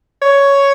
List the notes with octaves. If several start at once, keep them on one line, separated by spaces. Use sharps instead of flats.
C#5